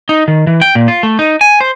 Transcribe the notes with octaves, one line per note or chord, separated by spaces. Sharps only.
D#4
D#3
E3
G5
A#2
F4
A3
D#4
G#5
C5